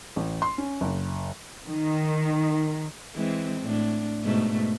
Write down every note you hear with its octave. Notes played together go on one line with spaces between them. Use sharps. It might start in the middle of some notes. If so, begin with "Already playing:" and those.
A1
C6
C#4
F#1
D#3
E3 G#3 C4
A2 D4
G#2 B2 A3